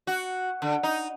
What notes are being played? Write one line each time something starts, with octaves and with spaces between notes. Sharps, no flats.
F#4
D3
D#4